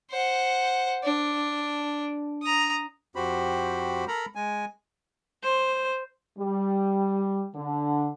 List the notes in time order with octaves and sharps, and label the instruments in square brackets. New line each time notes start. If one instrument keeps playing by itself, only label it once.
[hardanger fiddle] C5 F#5
D4
A#5 D#6
[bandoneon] F2 F#4 G4 C5 B5
A4 A#4 A#5 B5
G#3 G#5
[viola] C5
[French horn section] G3
D3